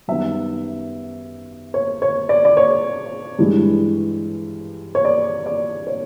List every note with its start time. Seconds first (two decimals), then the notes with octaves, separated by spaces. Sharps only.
0.08 F#2 D#3 G3 B3 D#4 E5
1.74 C#5
2.02 C#5
2.29 D5
2.45 D5
2.57 C#5
3.39 G2 E3 G#3
4.95 C#5
5.05 D5
5.46 D5
5.87 C#5